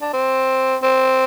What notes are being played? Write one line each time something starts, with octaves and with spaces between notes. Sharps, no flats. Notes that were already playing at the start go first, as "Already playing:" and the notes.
D4
C4
C4